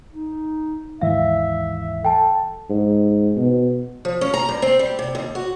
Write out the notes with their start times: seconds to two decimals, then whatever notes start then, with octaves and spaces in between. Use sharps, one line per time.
0.12 D#4
1.01 D#2 G#2 E3 E5 F5
2.05 A4 G5 A5
2.70 G#2
3.37 B2
4.05 F3
4.21 C#4
4.34 A#5
4.49 G2
4.62 C4
4.79 G3
4.99 C3
5.15 D#2
5.35 F#4